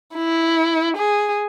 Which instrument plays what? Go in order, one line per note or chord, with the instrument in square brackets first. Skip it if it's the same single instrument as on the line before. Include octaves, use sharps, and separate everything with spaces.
[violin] E4
G#4